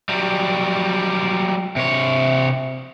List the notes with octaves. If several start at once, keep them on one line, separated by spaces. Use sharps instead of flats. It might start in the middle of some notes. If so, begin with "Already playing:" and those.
F#3 G3
C3 C#5